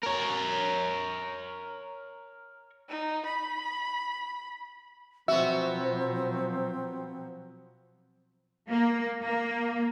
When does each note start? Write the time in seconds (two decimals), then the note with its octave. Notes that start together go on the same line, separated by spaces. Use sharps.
0.03 A#4 C#5
2.89 D#4
3.26 B5
5.28 B2 F3 F#3 B3 C4 F#4 E5
8.69 A#3
9.24 A#3